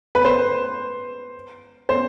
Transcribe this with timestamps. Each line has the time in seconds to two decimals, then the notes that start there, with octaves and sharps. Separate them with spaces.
0.15 B4
0.25 C5
1.89 C5